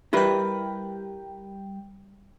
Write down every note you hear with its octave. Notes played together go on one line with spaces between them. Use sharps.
G3 E4 A#4 B4 G5